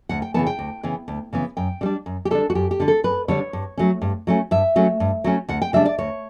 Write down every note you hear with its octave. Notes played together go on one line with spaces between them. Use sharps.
D2 F#5
G5
C#3 E3 B3 A5
G5
D2
C#3 E3 B3
D2
C#3 E3 B3
F#2 G5
D3 G3 D4
F#2
G4
D3 G3 D4 A4
F#4
F#2 G4
G4
D3 G3 D4
A4
F#2 B4
D3 G3 D4 C#5
G2
F#3 A3 C#4
G2
F#3 A3 C#4
G2 E5
F#3 A3 C#4
G2
F#3 A3 C#4
D2 F#5
G5
C#3 G3 D4 E5
D5
D2 C#5